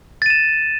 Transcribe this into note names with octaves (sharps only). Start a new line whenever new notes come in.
A6 D#7 E7